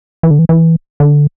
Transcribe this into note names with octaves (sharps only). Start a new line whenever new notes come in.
E3
D3
E3
E3
D3